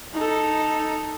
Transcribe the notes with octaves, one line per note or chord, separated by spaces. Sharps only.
D#4 A4